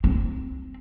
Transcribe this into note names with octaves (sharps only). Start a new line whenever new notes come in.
C4